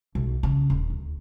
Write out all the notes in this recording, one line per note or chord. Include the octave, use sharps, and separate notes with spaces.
B1
C#3
D#1
D2